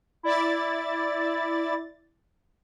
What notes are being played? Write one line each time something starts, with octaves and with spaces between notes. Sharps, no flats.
E4 D5 A6